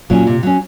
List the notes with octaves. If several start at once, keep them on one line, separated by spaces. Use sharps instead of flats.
A#2 F#3 C#4
C3
F#3 C#4